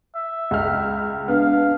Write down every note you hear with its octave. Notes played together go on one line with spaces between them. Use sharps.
E5
C#2 F6
B3 D4 F5